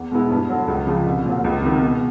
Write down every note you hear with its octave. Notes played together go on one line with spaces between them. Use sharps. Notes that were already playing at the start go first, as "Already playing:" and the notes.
Already playing: E2
B2 G#3 B3 E4
G2
D3 F#3
C#2
C#3 F3
C2
A#2 F#3
C#2
C3 D#3
B2